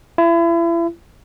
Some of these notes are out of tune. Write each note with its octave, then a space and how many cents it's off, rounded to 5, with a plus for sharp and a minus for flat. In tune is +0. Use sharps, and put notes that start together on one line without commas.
E4 +35